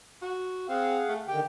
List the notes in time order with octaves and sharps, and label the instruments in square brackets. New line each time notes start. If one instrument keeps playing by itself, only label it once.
[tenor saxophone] F#4
[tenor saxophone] C4 [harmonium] G#4 F5 F#5
[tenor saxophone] A3
[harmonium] D3 D#3 G5 [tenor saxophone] G4